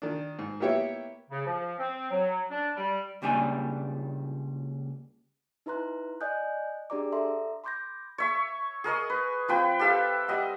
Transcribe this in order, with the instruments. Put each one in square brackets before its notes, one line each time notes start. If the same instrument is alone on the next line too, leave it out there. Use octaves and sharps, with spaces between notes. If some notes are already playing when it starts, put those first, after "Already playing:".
[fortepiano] D#3 D4
G#2
A#3 B3 E4 G4 C#5 E5
[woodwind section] C#3
F3
C4
F#3
D4
G3
[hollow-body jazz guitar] C#2 A#2 G3 D4 G#5
[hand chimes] D#4 E4 B4 A#5 C6 F#6
D5 D#5 G#5 D#6 F#6 G6
D4 G4 G#4 D5 A#5 D6
A4 E5 A#5 C6
B5 C6 D6 G6 G#6 A#6
[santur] C#5 E5 C#6
G#4 A#4 C#5 D#5
B4
F3 C4 B4 G5
G4 A4 E5 F5
G3 D#5 E5 F#5